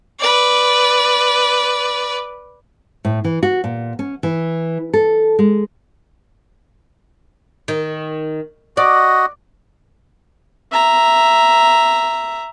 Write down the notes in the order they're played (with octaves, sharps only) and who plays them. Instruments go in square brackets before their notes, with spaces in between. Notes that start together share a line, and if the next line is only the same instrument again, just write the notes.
[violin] B4 D5
[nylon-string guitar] A2
E3
F#4
A#2
C#4
E3
A4
G#3
[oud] D#3
[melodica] F#4 D#5 [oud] D5
[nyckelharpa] E5 A#5